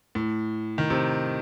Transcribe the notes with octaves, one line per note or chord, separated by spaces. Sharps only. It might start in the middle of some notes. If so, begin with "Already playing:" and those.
A2
D#3
C3